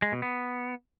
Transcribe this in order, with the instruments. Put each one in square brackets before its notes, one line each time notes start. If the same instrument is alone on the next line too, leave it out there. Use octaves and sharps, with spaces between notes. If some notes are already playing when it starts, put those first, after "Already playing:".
[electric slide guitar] G#3
B2
B3